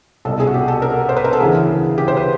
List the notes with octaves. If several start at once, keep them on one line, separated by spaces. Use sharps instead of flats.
C2 B2 A4
G#4
F#4
G4
A4
A#4
C5
B4
A#4
A4
D2 C#3 E3 G#4
G4
C5
B4